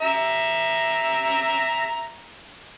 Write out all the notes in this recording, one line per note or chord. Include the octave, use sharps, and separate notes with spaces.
E5 A#5